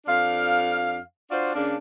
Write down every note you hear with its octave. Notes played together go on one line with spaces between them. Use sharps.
F2 D4 F5
D4 F4 F#4 C5 D5
C#3 A#3 D4